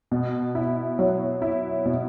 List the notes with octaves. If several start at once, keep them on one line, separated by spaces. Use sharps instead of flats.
B2
E4
F#3
E4
B2